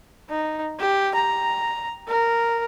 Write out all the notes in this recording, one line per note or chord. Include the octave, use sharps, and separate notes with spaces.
D#4
G4
A#5
A#4